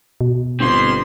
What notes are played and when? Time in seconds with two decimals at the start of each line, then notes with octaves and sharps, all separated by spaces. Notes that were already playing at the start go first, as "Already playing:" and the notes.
0.21 B2
0.60 G1 C4 F5 C6